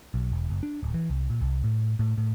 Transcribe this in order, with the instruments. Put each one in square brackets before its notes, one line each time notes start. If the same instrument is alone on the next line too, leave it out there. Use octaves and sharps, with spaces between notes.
[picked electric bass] B1
E1
F#1
D4
D1
E3
C2
A#2
C2
A2
A2
A2